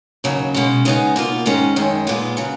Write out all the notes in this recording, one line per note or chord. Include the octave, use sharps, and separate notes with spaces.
D#2 C#3 F#3
B2 G#3 C#4
C#3 G#3 B3 D#4
B2 A#3 F4
G#2 D#3 G#3 C#4
F#2 D#3 G#3
A#2 G#3 B3 F4
C#3 F#3